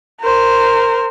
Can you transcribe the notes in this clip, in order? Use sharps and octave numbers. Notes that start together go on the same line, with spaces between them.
A#4 C5